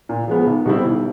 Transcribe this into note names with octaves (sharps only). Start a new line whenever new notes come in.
A#2
F3 G#3 B3
B1
B2 G3 C4 E4
B1